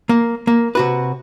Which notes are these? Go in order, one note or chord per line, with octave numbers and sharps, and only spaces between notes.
A#3
A#3
C3 F#4 B4